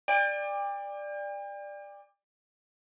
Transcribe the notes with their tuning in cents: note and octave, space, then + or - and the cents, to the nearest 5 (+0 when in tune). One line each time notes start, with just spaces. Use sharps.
D5 +10 G5 +40